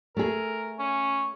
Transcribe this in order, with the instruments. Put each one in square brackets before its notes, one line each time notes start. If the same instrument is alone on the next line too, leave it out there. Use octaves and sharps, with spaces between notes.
[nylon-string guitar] A3 G#4 [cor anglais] A#4
[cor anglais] C#4